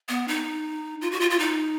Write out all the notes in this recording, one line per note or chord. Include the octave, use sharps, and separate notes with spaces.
B3
D#4
F4
F#4
F4
F4
D#4